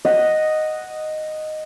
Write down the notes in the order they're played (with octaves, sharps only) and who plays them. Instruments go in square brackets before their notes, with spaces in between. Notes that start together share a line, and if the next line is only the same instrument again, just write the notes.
[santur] D#5 F#5